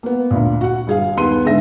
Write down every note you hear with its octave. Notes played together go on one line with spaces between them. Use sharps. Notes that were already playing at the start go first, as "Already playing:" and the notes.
A#3 B3
D2 A#2
F#4 F#5
G1 G#4 F5
D#2 D#3 B3 B4 C6 D#7
G#2 D3 G#3 E5 A#6